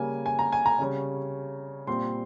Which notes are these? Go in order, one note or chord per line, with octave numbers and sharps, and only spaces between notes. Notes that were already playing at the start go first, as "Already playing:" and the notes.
Already playing: C#3 G3 A#3 G#5
G#5
A#5
G#5
A#5
C#3 G3 C#4
A#2 G3 C4 C6